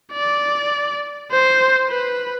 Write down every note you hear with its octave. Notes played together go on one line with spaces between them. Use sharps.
D5
C5
B4